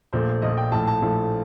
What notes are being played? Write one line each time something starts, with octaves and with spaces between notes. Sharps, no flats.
A#1 A#2 A3 C5
A#1 A#2 A3 D#5
G5
A#1 A2 F3 A3 A5
A5
A#1 A2 F3 A3